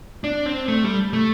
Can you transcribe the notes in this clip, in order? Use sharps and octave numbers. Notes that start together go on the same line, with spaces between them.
D4
C4
A3
G3
A3